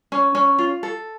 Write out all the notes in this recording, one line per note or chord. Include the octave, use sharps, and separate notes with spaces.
C#4
C#4
F4
A4